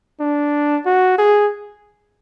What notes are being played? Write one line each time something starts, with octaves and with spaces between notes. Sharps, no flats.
D4
F#4
G#4